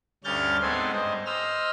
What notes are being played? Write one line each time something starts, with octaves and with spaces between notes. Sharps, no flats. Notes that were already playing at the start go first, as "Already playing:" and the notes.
D2 G2 C#4 F6 G6 A6
G#2 B3 C4 A4 G#5 C6
G2 C5 D#5
C5 D#5 E6 F6